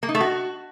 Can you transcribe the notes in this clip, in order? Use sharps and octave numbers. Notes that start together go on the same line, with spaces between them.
A#3
D#4
A3
F#4